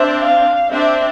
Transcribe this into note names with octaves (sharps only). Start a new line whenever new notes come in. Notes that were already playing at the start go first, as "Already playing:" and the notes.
Already playing: C4 D4 E5
F5
C4 D4 E5